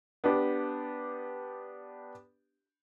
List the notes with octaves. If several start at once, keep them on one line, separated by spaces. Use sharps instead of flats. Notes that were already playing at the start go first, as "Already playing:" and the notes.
B3 D4 G4